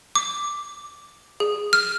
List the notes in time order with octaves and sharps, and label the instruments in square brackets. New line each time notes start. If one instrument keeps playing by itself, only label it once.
[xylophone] D6
G#4
F6